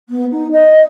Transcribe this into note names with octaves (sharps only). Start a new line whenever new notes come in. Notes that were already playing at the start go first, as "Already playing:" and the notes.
B3
D#4
D#5